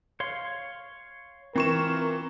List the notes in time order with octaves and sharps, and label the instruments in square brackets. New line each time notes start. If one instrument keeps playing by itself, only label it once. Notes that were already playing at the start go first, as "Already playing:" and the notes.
[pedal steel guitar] C#5 F5 C6
[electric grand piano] E3 C#6 E7 [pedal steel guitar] C4 F4 [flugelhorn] A#4